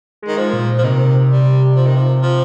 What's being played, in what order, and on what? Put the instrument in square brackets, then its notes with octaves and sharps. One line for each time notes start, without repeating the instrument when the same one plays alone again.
[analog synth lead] G#3
[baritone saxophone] D#3
F3
[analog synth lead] A#2
[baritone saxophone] F3
[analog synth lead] C3 [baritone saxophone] D#3
[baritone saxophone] G3
F3
D#3
F3
F3